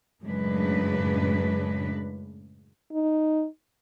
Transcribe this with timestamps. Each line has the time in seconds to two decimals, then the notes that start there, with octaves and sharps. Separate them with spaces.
0.23 F#2 A2 C#3 G#3 D4 B4
2.92 D#4